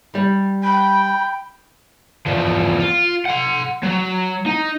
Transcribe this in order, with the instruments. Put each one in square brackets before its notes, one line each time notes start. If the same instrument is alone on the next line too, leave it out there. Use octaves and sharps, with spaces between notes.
[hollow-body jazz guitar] G3
[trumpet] G5 [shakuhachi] B5
[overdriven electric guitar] E2 F3
F4
F#5 C6
F#3
D#4